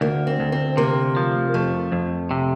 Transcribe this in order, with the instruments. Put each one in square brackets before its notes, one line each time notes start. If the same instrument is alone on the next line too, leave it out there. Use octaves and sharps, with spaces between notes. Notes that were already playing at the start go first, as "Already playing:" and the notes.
[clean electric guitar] D2 [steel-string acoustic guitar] A#3
[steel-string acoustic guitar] C4
[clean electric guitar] D2
[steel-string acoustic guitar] C4
[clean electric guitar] C3 [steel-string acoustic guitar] A#3
[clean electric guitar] F3
[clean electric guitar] F2 [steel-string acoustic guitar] A3
[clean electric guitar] F2
C3